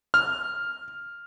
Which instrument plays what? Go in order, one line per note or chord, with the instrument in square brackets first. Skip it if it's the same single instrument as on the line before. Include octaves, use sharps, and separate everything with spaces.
[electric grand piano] F6